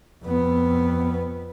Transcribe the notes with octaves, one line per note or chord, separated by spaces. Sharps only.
F2 B3